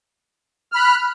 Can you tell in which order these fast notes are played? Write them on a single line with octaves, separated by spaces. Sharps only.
F6 B5 F#6